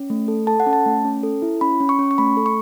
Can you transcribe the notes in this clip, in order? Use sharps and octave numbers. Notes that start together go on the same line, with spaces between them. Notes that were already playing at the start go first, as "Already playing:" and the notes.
Already playing: C#4
A3
A4
A4 A5
F#5
C#4
A5
A3
C#4
A4
E4
C#4 B5
C#4
C#6
C#4
C#6
A3 B5
A4
C#6